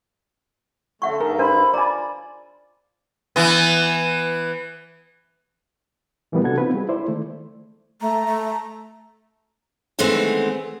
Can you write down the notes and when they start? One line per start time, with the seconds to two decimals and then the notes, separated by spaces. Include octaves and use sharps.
1.02 D3 A3 C#4 A4 E5 F#5 C#6
1.20 G2 D#4 G#4 A#4
1.39 D4 A#4 C5 B5
1.74 F4 D5 G#5 A#5
3.36 E3 B3
6.32 A#2 E3 F3 G3 A#3 B3
6.44 C3 D4 F#4 A4 F#5 G#6
6.58 B3 C4 D#4 F4 B4
6.74 G3 G#4
6.89 E4 C5 D5
7.08 D#3 A3
8.01 A3 A#5
8.26 A3
9.99 D#3 E3 G#3 A3 B3 C4